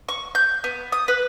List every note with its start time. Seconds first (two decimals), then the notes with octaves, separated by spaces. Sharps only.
0.09 C#6
0.35 G6
0.64 B3
0.92 D#6
1.08 B4